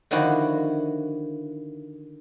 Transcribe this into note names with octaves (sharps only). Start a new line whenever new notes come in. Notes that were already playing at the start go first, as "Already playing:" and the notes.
D3 D#3 F3 E4 F#4